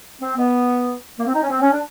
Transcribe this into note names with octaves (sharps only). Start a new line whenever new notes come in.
C4
B3
A#3
C4
D#4
C#4
C4
C#4
D4